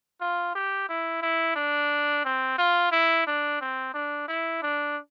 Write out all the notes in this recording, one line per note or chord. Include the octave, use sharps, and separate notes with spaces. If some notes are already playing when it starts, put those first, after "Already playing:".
F4
G4
E4
E4
D4
C4
F4
E4
D4
C4
D4
E4
D4